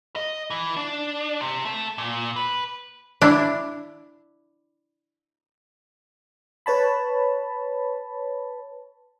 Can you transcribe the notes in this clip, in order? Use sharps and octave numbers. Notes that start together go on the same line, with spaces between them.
D#5
E3
D4
C3
A3
A#2
B4
D4 E4
B4 C#5 A5 B5